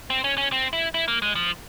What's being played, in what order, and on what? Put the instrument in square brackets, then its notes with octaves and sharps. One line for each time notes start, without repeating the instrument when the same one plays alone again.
[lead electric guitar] C4
C#4
C#4
C4
E4
E4
A#3
G#3
F3